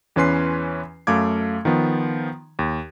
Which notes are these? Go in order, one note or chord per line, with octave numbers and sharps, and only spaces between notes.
E2 E3 C#4 B4 C6 C7
F#2 A3 F5 D6 G#6
D#3 F3 B3
D#2